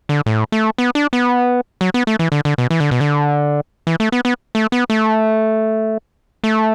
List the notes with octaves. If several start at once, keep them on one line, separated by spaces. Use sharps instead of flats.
D3
A2
A3
B3
D4
B3
F#3
B3
A3
E3
D3
D3
B2
E3
D3
B2
D3
E3
A3
B3
B3
A3
B3
A3
A3